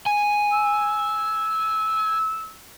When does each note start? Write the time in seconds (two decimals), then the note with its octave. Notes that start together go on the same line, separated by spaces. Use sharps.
0.06 G#5
0.52 E6